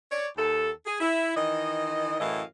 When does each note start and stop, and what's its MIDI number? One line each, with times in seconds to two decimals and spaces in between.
0.11 0.27 73
0.11 0.27 74
0.37 0.70 39
0.37 0.70 69
0.86 0.99 68
1.00 1.35 64
1.35 2.18 51
1.35 2.18 52
1.35 2.18 75
2.19 2.43 42
2.19 2.43 45
2.19 2.43 52
2.19 2.43 75
2.19 2.43 77